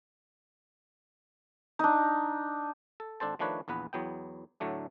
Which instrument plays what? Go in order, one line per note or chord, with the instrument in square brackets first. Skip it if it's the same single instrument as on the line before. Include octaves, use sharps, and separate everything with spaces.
[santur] D4 D#4
[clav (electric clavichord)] A4
G#1 D4 A4 C5 A5
D#3 F3 A3 D4 B4 C#5
A#1 E2 B3 B4
E2 F#3 B3 G5
A2 D3 F#3 A3 D4